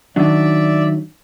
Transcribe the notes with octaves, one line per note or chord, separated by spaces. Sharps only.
D#3 F#3 D4 D5 E5